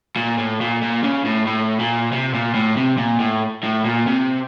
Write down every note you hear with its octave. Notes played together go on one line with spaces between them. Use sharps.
A#2
A2
A#2
A#2
C#3
A2
A2
A#2
C3
A#2
A2
C3
A#2
A2
A2
A#2
C3